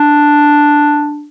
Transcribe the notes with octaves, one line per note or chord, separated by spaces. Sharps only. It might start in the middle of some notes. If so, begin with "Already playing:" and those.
Already playing: D4